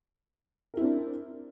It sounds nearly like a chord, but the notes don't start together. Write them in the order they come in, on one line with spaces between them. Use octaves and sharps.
A#4 E4 C4 D4